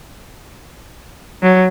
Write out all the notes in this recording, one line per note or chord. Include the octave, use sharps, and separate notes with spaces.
F#3